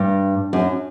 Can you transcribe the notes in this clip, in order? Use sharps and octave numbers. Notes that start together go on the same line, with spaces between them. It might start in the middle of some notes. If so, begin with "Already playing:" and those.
Already playing: G2
F#2